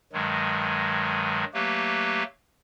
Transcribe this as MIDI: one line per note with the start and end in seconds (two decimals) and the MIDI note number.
0.13 1.44 43
0.13 1.44 51
0.13 1.44 54
0.13 1.44 56
1.54 2.23 54
1.54 2.23 57
1.54 2.23 58
1.54 2.23 67
1.54 2.23 71